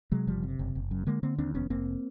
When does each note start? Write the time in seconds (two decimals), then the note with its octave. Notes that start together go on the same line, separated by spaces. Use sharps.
0.12 C3 F#3 G#3
0.27 F#1 F3 G3
0.43 C3
0.59 F#1
0.75 F#1
0.91 F#2
1.07 D3 G#3 A#3
1.23 D3 A#3 C4
1.38 D#2 C4 D4
1.55 F1 B3 C#4
1.70 F1 A#3 C4